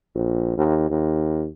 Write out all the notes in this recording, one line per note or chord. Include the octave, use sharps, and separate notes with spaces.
A#1
D#2
D#2